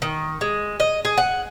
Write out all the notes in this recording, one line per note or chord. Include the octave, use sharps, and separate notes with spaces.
D#3
G#3
D#5
G#4
F#5